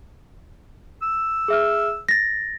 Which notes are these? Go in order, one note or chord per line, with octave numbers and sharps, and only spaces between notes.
E6
G#4 E5 F6
A6 A#6